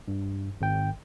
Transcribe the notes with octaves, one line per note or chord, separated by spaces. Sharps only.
G2
G#1 G5